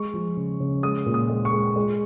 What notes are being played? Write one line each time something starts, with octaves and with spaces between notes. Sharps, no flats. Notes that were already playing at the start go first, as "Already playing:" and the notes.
Already playing: G#3 C#6
F3
C#3
C#3
G#3 D#6
A#2
D#6
G#3
C#6
G#3
G#3